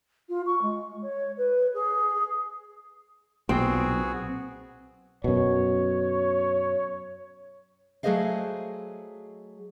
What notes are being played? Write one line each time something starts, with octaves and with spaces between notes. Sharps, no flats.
F4
C#6
G#3
C#5
B4
G#4
B1 A#2 B3 C4 F#4 G#4
F#2 B2 C#5
F#3 A3 G#4 C5 D#5 F5